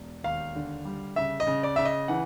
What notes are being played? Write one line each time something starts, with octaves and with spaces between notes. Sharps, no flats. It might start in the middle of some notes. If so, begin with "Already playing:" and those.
Already playing: E1
D#2 F5
D3
G3
C#3 E5
D#5
C#3
D5
C#3 E5
D#5
E3 F#5